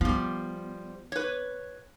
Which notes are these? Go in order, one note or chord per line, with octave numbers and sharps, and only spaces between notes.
F3 G3 B3
B4 C#5